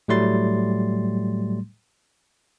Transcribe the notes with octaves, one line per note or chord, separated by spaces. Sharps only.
A2 F#3 G3 A3 C6 A6